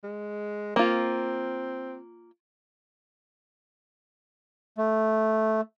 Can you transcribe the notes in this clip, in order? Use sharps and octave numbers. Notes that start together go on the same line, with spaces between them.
G#3
A#3 C4 F4
A3